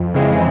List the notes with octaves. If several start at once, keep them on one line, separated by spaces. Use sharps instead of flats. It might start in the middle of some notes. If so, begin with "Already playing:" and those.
Already playing: F2
C#3 E3 G#3 C4